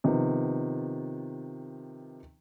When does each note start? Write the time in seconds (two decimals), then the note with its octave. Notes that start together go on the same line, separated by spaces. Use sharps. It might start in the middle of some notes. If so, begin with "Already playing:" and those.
0.04 C3 D#3 F3 B3